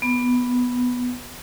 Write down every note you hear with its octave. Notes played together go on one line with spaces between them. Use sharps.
B3